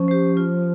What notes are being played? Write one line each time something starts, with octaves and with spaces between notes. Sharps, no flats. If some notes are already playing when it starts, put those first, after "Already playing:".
Already playing: F3 C#4
G4 C5
F4